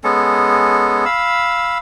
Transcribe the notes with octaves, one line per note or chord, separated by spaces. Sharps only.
G#3 B3 C#4 A4
F5 B5 E6